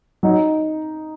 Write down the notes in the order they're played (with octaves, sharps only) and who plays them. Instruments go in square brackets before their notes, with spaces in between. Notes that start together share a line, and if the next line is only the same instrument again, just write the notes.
[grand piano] F#3 [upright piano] D#4